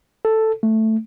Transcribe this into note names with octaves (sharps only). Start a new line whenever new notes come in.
A4
A3